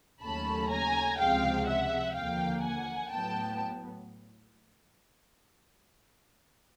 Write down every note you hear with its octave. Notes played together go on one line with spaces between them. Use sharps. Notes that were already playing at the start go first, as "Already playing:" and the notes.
D#2 C#3 F#3 A3 C#4 A5 B5
G#5 A#5
C#2 C3 F3 G#3 F5 G5
E5 F#5
D#2 D3 F3 A#3 F5 G5
F#5 G#5
A2 F#3 B3 G5 A5